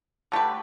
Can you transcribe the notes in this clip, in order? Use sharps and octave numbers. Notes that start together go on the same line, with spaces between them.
D3 A3 G4 B4